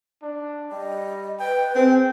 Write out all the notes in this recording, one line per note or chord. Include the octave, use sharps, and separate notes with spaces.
D4
G3 D#5
B4 G5
C4 G#4